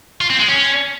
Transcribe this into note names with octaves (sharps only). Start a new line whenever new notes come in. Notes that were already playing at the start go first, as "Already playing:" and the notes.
F4
C4
G#3
C#4